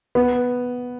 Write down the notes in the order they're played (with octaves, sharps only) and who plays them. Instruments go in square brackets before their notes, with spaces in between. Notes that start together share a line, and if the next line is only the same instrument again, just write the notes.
[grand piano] B3